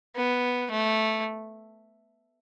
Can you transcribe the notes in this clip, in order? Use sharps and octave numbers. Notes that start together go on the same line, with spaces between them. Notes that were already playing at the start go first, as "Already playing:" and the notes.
B3
A3